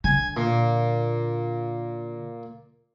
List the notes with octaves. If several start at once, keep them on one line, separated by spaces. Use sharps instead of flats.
D3 G#5
A#2